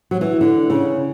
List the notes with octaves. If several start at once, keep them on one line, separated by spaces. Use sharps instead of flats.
F#3
E3
D3
C#3